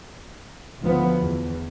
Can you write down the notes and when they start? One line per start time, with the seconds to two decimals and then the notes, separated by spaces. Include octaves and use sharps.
0.82 D2 D#3 F3 B3
1.21 E2